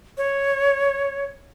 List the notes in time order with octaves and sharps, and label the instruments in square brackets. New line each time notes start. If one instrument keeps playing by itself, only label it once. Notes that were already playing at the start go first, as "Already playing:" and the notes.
[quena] C#5